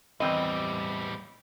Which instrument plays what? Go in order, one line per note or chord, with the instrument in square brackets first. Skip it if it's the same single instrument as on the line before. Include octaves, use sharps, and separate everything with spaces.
[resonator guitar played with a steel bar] E2 C4 D#5 [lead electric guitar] A2 G3